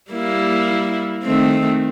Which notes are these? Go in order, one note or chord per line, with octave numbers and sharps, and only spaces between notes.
G3 A#3 E4
D#3 A3 C4